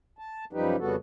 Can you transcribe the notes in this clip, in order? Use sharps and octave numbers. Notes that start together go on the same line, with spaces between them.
A5
F#2 F3 G3 D#4 G4 B4
F2 C#3 G3 B3 F#4 A4